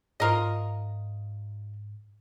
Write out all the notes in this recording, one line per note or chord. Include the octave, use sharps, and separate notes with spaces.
G#2 F4 A#4 D#5